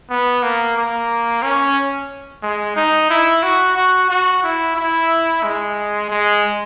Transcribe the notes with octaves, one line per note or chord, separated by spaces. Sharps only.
B3
A#3
A#3
C#4
G#3
D#4
E4
F#4
F#4
F#4
E4
E4
G#3
G#3